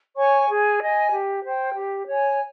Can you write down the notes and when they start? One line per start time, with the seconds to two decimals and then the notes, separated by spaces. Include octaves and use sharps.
0.16 C#5 G#5 C#6
0.48 G#4
0.81 D#5 G#5
1.12 G4
1.44 C5 G5
1.76 G4
2.07 C#5 G#5